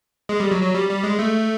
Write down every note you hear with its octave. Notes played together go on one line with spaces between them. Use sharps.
G#3
G3
F#3
F#3
G3
G3
G#3
A3